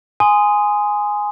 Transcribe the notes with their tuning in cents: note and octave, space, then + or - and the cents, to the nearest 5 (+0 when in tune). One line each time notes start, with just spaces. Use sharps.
G#5 +0 C6 -20 D#6 +0